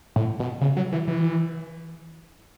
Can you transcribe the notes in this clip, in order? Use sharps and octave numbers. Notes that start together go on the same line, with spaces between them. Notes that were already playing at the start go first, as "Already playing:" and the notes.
A2
B2
C#3
F#3
E3
E3